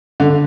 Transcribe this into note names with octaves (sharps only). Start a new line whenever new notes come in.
D3